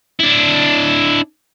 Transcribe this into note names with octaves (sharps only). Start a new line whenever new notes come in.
D4 E4